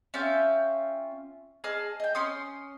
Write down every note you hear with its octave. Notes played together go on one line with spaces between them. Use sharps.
C#4 F4 E5 G5
G#4 D#5 A5 F6
D#5 G5
C#4 C6 D#6